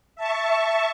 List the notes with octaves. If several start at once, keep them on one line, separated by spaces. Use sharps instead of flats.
E5 A5 C#6